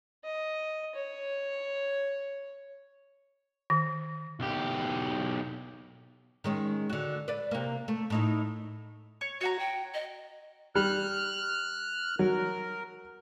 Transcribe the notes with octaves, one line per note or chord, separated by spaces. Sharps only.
D#5
C#5
D#3
B1 G4
D#3 G#3 C#4
D3 F#4
B4 D5
C3 A#3
A3
A2 D#4 E4
C#5
F#4 C#5 F#5 A#5
G5
D#5
G3 F6 F#6
F#3 A#4